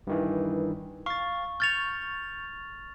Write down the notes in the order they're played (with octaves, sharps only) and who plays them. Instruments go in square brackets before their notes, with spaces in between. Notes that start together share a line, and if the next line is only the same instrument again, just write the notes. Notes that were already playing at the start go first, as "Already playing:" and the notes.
[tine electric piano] G2 D#3 E3
[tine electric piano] F5 A6 [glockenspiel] C#6
[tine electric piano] C#6 G6 [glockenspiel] F6 A6 F7